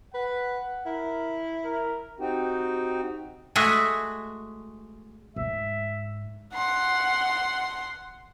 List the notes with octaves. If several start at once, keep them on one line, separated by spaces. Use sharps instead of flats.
B4 F#5
E4 A#4
A#4
C4 D#4 F#4 G4
G#3 A3 F#4 G#4 E5
G#2 G#3 E5
F#5 C6